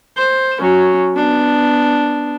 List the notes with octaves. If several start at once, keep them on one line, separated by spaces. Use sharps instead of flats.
C5
F#3 C#4
B3 D4